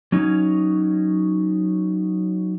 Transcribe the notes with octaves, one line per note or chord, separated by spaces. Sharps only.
F#3 C#4 D#4